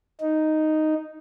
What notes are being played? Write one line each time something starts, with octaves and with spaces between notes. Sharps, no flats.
D#4